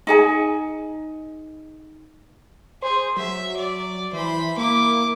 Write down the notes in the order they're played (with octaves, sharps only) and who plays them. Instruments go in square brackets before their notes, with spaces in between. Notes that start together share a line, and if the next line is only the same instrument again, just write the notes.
[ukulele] D#4 G#4 G#5
[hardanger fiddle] G#4 [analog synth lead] C5
[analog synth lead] F#3 [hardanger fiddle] E5
[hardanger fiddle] D5
[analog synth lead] E3 [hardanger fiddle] C5 B5
[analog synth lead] A#3 [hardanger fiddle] E4 D6